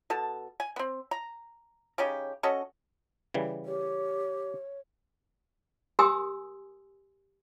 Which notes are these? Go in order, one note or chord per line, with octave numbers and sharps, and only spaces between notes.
B2 A4 A5
G#5
B3 C4
A#5
C#3 C#4 D#4 G4
C#4 F#4 A4 D#5
C#3 E3 G3
G4 C#5
G4 A#4 G#5 C6 D#6 E6